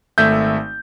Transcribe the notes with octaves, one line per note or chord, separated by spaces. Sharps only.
G#1 A3 E5 G6